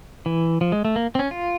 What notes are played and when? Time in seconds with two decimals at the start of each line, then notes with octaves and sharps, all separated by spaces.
0.26 E3
0.61 F3
0.72 G#3
0.85 A3
0.96 A#3
1.15 C4
1.19 C#4
1.31 F4